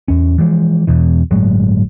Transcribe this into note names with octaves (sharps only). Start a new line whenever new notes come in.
E2 C#4
E3 F3 G#3
E2 B2 E3
G1 A2 F#3 G#3